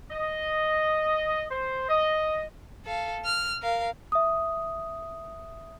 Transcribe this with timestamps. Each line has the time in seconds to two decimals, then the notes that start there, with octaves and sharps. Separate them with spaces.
0.11 D#5
1.51 C5
1.89 D#5
2.85 A4 F5
3.25 F6
3.62 A#4 F5
4.12 E5 D#6